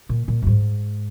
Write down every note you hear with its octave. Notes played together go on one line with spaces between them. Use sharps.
A#2
A#2
F#2
G#2